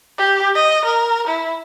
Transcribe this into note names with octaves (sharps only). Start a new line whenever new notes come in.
G4
D#5
A#4
E4